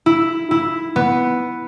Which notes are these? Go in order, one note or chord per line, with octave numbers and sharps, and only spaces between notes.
E4
E4
B3